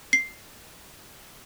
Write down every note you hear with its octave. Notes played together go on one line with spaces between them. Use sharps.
C7